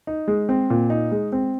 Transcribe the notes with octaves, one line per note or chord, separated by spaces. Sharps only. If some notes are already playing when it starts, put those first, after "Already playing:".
D#4
G#3
C4
A#2
D#4
G#3
C4